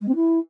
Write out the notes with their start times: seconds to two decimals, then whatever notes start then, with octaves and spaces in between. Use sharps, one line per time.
0.01 G#3
0.08 C4
0.15 E4